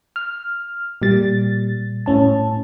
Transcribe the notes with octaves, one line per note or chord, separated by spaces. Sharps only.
F6
A#2 G3 A6
A2 C#4 A5